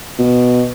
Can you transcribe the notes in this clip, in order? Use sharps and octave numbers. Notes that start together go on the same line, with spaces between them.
B2